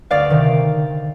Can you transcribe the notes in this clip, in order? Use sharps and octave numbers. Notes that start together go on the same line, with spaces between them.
D2 D5 F5
C3 D#3